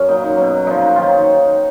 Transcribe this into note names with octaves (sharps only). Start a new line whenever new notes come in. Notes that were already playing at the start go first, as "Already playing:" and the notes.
Already playing: F#2 C#4
A#2 F#3 D#4
D#4
B2 F#3
A#2 F3 D#4
D#4
D#3 F#3 F4